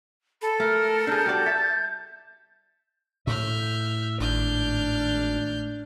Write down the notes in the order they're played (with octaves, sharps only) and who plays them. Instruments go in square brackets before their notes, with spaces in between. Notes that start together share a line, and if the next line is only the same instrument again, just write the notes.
[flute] A4 [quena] B5
[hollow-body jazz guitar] A3 [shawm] A#4 [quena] F6
[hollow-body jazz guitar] D4 G#4 [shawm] A#4 [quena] G6
[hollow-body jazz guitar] G3 F#4 D5
[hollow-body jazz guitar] E5 [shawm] A5
[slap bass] A2 [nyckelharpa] E5 [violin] F6 G6
[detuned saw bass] G#1 [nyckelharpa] D4 [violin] F6 G6